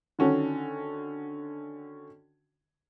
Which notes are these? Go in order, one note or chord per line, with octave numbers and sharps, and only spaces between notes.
D3 D#3 C#4 F#4 A4